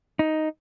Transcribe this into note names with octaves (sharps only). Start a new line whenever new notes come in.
D#4